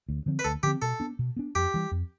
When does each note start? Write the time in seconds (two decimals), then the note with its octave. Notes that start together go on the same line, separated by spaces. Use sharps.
0.09 D2
0.26 D3 F3 C4
0.39 B4
0.44 D2 A4
0.63 D3 F3 C4 G4
0.82 B2 A4
1.00 B3 D4
1.19 B2
1.36 B3 D4
1.55 F2 G4
1.74 E3 G3
1.91 F2